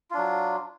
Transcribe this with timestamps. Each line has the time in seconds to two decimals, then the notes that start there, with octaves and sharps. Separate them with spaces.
0.11 F4
0.14 D4
0.17 F#3